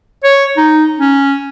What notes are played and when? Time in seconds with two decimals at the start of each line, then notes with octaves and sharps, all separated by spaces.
0.24 C#5
0.57 D#4
0.99 C#4